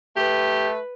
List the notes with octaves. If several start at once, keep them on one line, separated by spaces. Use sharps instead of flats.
A3 G4 B4